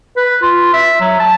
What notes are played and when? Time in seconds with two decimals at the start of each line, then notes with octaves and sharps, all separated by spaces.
0.17 B4
0.42 F4
0.74 E5
1.01 F#3
1.20 A5